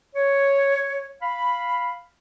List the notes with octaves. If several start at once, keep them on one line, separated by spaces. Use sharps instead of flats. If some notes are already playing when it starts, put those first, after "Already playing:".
C#5
F5 B5